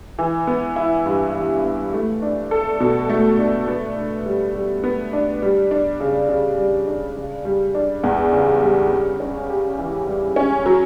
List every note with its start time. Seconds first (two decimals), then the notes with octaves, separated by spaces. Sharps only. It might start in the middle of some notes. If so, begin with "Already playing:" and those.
0.19 E3
0.47 B3
0.76 E4
1.06 G2
1.35 E3
1.64 B3
1.93 A3
2.22 D4
2.51 A4
2.80 B2
3.10 A3
3.39 D4
3.68 B3
3.96 D4
4.26 G3
4.55 G3
4.84 B3
5.13 D4
5.42 G3
5.71 D4
6.00 C#3
6.29 C#3
6.58 G3
6.88 D4
7.16 C#3
7.45 G3
7.75 D4
8.03 E2
8.33 C#3
8.62 G3
8.91 G3
9.20 C#4
9.50 G4
9.78 E3
10.07 G3
10.36 C#4
10.66 F#3